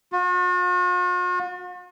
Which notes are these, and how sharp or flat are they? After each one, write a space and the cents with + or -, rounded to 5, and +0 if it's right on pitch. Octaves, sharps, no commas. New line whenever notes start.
F#4 -45